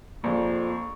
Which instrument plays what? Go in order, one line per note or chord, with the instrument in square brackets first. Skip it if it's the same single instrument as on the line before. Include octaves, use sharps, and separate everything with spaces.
[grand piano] A#1 [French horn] F2 [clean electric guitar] A#3 C5 [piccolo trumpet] C#6